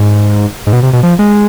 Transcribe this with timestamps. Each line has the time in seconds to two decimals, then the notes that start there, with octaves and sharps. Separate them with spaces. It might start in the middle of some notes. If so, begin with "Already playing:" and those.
Already playing: G#2
0.67 G#2
0.73 B2
0.83 C3
0.93 B2
1.03 F3
1.19 G#3